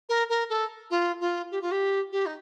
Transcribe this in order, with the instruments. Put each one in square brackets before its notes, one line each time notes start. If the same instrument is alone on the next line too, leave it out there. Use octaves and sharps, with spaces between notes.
[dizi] A#4
A#4
A4
F4
F4
G4
F4
G4
G4
D#4